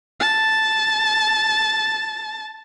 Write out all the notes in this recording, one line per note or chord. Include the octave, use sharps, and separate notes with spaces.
A5